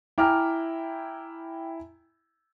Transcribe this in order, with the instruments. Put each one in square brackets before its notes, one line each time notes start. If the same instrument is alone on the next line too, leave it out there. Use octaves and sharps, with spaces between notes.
[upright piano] E4 G#5 A#5 [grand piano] G5 D6 F6